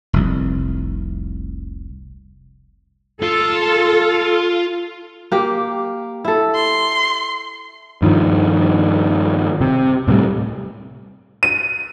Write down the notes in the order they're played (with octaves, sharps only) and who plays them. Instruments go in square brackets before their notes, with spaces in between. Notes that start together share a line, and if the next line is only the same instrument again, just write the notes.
[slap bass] F1 C2
[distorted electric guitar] F4 [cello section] A4
[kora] A#3 G4
E4 A4
[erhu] C6
[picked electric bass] G2 D#3 F3
C3
A2 C3 D#3 G3
[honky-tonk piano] D#7